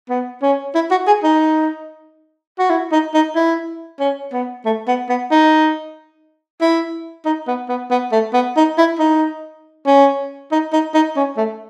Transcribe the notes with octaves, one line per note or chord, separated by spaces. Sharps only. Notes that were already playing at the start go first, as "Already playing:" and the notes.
B3
C#4
E4
F#4
G#4
D#4
F#4
E4
D#4
D#4
E4
C#4
B3
A3
B3
B3
D#4
E4
D#4
B3
B3
B3
A3
B3
D#4
E4
D#4
C#4
D#4
D#4
D#4
C#4
A3